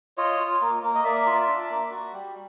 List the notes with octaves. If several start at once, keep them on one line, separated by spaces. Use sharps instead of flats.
F4 C#5 D#5
F4
A#3
A#3
D#5
A#3 D5 E5
F4
D4
A#3
F#4
G3